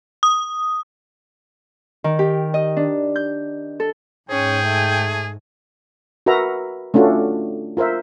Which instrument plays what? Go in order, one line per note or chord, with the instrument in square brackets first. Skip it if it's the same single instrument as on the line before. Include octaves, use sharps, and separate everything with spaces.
[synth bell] D#6
[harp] D#3
G4
D#5
D4
G6
A4
[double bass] G#2 [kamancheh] C#4 [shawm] G#4 [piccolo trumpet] G5
[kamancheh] A3 G#5
[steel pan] F#4 A#4 B4 E5 A#5
A3 C#4 D4 F4 F#4
F4 A#4 C5 E5